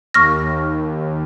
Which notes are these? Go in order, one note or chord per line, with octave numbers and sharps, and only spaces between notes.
D#2 C#6 F6 A#6